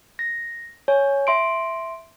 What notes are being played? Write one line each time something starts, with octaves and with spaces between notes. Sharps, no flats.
A#6
C#5 G#5
E5 C6 D7